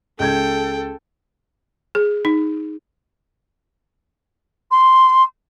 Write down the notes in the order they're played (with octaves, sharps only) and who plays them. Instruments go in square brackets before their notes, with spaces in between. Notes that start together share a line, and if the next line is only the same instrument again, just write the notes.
[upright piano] C#2 G6 G#6 [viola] A4 [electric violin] G5
[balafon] G#4
D#4
[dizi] C6